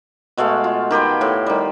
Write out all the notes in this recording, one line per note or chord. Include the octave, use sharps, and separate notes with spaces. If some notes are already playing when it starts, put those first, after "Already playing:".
B2 G#3 A3 F5
F4
D#3 G4 G#4 B4
A2 C6
D#3 G3